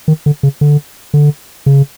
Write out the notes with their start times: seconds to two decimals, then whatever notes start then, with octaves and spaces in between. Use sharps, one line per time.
0.08 D#3
0.26 D3
0.43 C#3
0.61 D3
1.14 D3
1.66 C#3